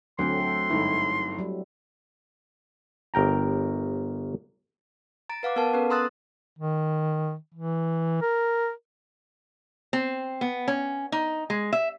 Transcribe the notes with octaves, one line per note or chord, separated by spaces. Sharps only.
D2 F#3 A3 C4 C6
A4
G1 G#2 E4
F#3 G3
G1 A#4 G5 A#5
A#5 A6 D7
B4 F5 F#5 D6
B3 A#4 F5 F#5 A5
B3 C#4 A4 B4
A#5 C6 D#6 E6 F#6 A6
D#3
E3
A#4
C4
B3
C#4
D#4
G#3
E5